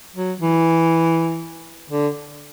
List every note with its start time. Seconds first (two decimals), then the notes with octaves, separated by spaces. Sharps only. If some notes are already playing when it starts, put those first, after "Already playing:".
0.15 F#3
0.41 E3
1.90 D3